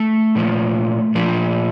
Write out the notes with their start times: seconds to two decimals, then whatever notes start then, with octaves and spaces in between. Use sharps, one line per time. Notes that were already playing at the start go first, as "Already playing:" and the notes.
Already playing: A3
0.35 A#2 F3
1.15 A#2 F3